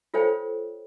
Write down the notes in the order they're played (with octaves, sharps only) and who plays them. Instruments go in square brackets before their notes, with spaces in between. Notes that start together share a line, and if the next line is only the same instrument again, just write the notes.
[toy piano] F4 A4 C5 C#5 G5